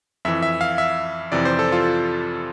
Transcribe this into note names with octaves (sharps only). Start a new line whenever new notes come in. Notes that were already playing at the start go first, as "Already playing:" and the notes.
F2 E3 E5
E5
F5
E5
F2 C3 E3 D5
C5
A4
F4